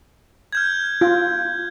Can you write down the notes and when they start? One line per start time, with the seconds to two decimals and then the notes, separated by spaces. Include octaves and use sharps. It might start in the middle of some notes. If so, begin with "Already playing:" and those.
0.53 F6 G6 G#6
1.01 F4